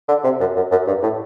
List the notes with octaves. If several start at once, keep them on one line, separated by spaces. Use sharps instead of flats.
D3
C3
F#2
F#2
F#2
G2
A2